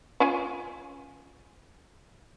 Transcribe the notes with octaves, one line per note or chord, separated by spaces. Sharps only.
C#4 F4 G#5